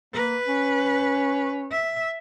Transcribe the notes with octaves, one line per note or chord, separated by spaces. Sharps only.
A#3 B4
C#4
E5